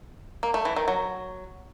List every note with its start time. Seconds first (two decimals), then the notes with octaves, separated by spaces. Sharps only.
0.43 A#3
0.54 A3
0.65 E3
0.76 D#3
0.88 F#3